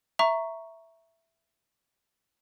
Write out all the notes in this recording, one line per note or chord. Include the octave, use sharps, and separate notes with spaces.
E5 A#5 C#6